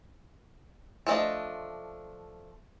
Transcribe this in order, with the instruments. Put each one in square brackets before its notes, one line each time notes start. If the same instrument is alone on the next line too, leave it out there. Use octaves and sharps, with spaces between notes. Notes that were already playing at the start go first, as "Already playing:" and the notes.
[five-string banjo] F3 A3 D4 D#5